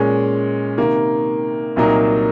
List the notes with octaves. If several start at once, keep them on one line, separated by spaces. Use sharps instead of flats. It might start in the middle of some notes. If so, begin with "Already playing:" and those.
Already playing: A#2 G#3 C#4
C3 D#3 A#3
C2 A#2 F#3 A#3 D#4